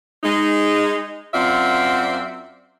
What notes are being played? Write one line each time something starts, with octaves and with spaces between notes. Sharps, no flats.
G#3 D#4
F#2 C4 F4 D5 E5 F#5